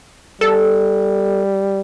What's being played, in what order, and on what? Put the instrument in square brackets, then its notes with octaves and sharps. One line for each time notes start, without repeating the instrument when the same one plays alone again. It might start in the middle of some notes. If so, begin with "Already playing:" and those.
[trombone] G3 [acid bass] A4